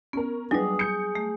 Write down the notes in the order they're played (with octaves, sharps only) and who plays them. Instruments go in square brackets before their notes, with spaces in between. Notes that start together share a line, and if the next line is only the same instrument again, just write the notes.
[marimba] B3 [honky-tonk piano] C#4 A#4
[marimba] F#3 G3 [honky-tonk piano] B3 D4 [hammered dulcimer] G#4
[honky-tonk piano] G6 C#7
[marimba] A3